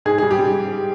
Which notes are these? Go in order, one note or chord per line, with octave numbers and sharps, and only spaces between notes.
G#2 G#4
G3 G#4
G4
G3